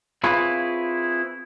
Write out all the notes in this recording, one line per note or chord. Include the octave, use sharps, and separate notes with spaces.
C4 E4 F4 G#4 B4 C#5